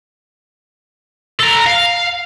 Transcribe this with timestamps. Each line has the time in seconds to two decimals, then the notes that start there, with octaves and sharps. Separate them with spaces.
1.40 A4 A#5
1.67 F5